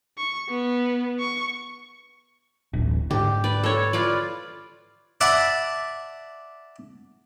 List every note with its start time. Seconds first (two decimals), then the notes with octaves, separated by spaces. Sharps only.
0.18 C#6
0.49 B3
1.20 C#6
2.73 D1 A1
3.11 G#2 D3 G4
3.44 B4 D5
3.64 A4 C#5
3.93 F4 B4 D5
5.21 D5 E5 F#5 A5 B5